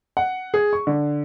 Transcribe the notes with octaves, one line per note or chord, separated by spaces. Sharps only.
F#5
G#4
C#6
D3